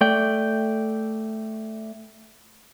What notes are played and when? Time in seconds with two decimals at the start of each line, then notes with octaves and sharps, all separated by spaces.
0.01 A3 D5 G5